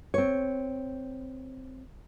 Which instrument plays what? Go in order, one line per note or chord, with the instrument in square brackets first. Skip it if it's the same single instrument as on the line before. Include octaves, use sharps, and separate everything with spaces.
[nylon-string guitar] C4 C#5